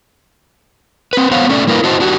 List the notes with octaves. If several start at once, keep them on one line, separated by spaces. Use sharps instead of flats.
C4 B4
B3 C5 C#5 F5 F#5
A3 C#4 D5
G3 A#3 E4 A#4 B4 F5
E4 F#4 C5 D#5 A5
D4 F#4 G4